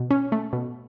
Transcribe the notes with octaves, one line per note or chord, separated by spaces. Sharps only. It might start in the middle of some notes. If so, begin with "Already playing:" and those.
Already playing: B2
C#4
A3
B2